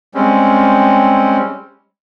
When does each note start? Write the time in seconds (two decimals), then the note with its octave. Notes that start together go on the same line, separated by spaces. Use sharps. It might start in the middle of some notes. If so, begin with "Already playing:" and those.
0.14 G3 G#3 C4 C#4